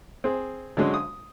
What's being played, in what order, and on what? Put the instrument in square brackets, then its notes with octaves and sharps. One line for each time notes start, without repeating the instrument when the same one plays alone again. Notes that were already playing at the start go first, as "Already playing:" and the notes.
[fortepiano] C4 G#4
D3 F#3 G#3 C#4
D#6